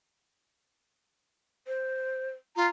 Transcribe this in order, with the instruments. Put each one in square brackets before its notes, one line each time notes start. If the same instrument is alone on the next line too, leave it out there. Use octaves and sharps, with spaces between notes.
[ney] C5
[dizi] F4 [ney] A#5